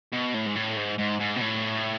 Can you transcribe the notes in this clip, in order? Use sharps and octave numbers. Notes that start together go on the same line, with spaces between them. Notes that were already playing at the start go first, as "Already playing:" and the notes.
B2
A2
G#2
A2
G#2
G#2
G#2
B2
A2